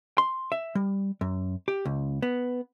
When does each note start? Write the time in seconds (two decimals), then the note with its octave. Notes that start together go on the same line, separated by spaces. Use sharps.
0.18 C6
0.52 E5
0.75 G3
1.21 F#2
1.68 G4
1.85 C#2
2.22 B3